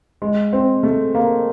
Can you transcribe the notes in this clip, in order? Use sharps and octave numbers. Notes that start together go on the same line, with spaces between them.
G#3
C4
A3
A#3